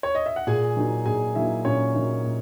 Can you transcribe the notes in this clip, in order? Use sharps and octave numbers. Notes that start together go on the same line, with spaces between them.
C#5
D#5
E5
F#5
A#2 G#4 G#5
F#3 A#3 D#4
A#2 G#4 G#5
F#3 A#3 D#4 E4 E5
A#2 C#4 C#5
F#3 A#3 D#4
A#2